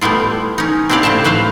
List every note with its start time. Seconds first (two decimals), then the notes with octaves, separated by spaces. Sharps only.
0.01 G3 A3 B3 E4 F4
0.58 C#4 D#4
0.89 C4 D4 E4 G4 D5 F5
1.03 A2 C#3 C5 E5 A5
1.24 F#3 B4 C5 E5 F5